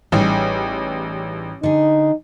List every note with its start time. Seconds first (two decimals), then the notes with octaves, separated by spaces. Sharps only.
0.12 A1 G3 D#4 G#4
1.63 D3 D#4 G#4